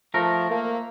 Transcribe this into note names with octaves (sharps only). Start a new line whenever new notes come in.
F3 A3 A#4
A#3